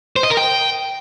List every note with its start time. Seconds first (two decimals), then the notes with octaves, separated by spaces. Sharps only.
0.16 C5
0.23 D#5
0.30 A#4
0.37 G5